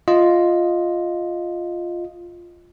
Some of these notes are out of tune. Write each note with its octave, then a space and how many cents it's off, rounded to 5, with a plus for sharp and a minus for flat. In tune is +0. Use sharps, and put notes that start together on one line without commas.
F4 +0 D#5 +0